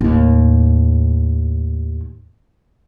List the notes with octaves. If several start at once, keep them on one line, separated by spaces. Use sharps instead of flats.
D#2 A2